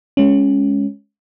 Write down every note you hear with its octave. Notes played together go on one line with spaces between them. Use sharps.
G#3 C#4